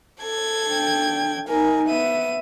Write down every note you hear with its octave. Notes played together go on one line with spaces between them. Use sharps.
A4 G#6
D4 G5
D#4 A#4 G#5
B3 E5 D#7